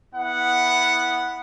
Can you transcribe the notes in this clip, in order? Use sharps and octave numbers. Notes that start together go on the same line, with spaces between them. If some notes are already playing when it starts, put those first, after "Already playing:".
B3 E4 F#5